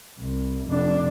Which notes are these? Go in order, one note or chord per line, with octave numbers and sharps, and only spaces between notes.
C2
F1 D4